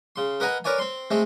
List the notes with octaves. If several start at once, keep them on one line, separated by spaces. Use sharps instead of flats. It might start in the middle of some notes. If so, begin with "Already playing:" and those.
C#3 C6
A#4 B4 D#5 F#5 G#5 A#5
A#4 B4 C#5 D5 G#5
C4 C6
G#3 A3 C4